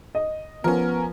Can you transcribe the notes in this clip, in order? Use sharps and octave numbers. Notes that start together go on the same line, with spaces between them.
D#5
F3 B3 C#4 A#4